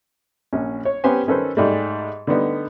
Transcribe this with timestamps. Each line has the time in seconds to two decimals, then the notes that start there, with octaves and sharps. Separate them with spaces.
0.53 A#1 C#4
0.85 C#5
1.04 B3 C#4 G4 B4 C5 G#5
1.27 D#3 C#4 A4 B4 C5
1.57 G#2 G3 A3
2.27 D3 G3 A3 B3 D#4